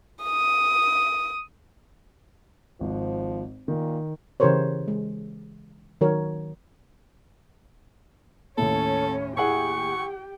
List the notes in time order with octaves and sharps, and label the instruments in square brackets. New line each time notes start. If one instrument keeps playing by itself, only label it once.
[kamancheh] D#6
[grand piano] G#1 [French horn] F3
[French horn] A#2 [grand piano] D#3
[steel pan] C#3 E3 G4 A#4 C5 C#5
G#3
D#3 F#3 F#4 A#4 C#5
[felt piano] D#2 A2 [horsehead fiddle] C#4 C#5 [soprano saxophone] A4
[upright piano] E4 G#4 F#5 [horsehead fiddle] G4 G5 [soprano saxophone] C#6